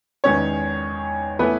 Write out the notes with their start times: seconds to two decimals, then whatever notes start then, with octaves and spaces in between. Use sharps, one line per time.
0.24 E2 D#3 G#3 B3 C#4 C#5
1.39 E3 A3 B3 B4